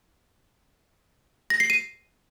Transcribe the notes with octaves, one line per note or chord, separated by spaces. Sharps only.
A#6
C7
D#7